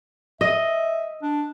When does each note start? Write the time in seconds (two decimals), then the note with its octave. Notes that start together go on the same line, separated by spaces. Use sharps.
0.41 D#5 E5
1.22 D4